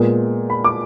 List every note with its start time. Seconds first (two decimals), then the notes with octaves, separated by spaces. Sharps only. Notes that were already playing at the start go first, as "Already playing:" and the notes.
Already playing: A#2 G#3 B3
0.50 B5
0.64 D6